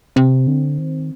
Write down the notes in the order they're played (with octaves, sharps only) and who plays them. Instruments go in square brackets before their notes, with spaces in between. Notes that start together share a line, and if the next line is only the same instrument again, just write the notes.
[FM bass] C3 [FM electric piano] C4
[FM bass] D3
D#3